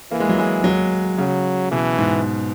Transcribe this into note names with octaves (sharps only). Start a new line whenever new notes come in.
E3 A#3
G#3
F#3
G#3
F#3
C#3 F#3
B2 E3
G#2